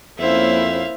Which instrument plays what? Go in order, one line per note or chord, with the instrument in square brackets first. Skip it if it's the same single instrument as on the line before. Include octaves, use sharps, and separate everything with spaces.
[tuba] F2 [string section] A#3 C#4 [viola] E4 C5 [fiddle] E5 F5